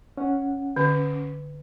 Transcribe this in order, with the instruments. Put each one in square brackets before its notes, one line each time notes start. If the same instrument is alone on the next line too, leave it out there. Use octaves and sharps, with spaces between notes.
[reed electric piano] C#4 F#5
[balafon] D3